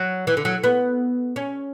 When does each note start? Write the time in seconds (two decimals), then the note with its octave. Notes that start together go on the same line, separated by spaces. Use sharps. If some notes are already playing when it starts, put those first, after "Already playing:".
Already playing: F#3
0.27 E3
0.37 D3
0.45 F#3
0.64 B3
1.36 C#4